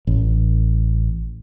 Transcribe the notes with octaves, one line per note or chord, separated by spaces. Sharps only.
A1